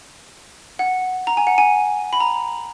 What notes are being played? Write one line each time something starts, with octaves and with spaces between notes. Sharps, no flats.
F#5
A#5
G#5
F#5
G#5
B5
A#5